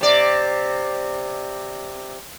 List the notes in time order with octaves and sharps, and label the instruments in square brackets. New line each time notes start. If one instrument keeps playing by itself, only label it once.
[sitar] C3 D5